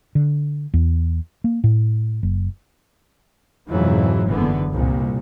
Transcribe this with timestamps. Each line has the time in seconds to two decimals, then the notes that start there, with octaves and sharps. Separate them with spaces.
0.15 D3
0.74 E2
1.44 A#3
1.64 A2
2.23 F#1
3.69 F2 G#2 B2 E3 F#3
4.28 F#1 D3 E3 B3
4.72 C2 A#2